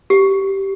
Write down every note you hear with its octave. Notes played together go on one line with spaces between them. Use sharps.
G4